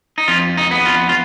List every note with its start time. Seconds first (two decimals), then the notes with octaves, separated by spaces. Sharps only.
0.18 D#4
0.28 F2 F4
0.57 D#4
0.71 B3
0.86 F4
1.09 F4